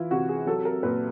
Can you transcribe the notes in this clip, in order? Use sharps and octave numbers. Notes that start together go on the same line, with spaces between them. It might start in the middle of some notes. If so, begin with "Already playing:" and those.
Already playing: E3 E4 F4
C3 F#4
G#4
F#3 A4
A#4
A#2 B4